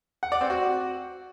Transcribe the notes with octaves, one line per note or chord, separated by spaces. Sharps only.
F#5
D5
C4
F#4